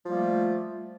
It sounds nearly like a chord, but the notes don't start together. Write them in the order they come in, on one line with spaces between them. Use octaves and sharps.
F3 G3 A#3 A3